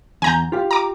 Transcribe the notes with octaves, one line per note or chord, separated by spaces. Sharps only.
E2 G#5 A#5 G6
F4 G4 F5
A#5 D6